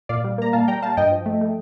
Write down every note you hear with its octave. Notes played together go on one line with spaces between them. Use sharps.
A#2 D5 F5
G3
A#3 A#5
A#2 F5 A5
G3 G5 A#5
G3 F5 A5
G2 D#5 G5
F3
A3
A3